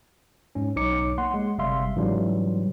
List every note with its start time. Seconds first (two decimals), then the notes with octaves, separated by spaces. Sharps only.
0.55 G#2 C#4
0.76 B1 D#4 C#5 D6 C#7
1.18 A#3 F#5 C6
1.34 G#3
1.58 G1 C3 G3 E5 F5 C6
1.96 G#2 C#3 E3 F#3 G3